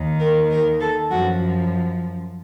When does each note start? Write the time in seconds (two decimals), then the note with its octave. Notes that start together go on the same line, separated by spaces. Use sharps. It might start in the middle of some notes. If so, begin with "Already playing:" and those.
Already playing: D#2 D#3
0.20 A#4
0.51 A#4
0.81 A4
1.11 F#2 F3 F#4